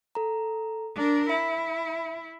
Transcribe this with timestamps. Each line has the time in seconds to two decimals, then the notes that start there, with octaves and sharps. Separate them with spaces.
0.15 A4 A#5
0.95 D4 A#4
1.29 E4 E5 B5